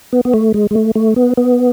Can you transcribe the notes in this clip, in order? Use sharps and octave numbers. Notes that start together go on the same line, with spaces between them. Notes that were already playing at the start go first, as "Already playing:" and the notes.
B3
B3
A3
G#3
G#3
A3
A3
B3
B3